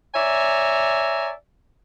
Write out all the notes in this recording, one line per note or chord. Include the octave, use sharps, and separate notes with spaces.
C#5 D5 E5 G#5 A#5